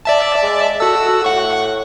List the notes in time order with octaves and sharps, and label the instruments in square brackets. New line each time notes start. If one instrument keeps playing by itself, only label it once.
[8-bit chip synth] D5 E5 A5
[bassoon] G#3
[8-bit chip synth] F#4 E6 [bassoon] A4
[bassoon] A2 [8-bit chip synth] F#5 C#6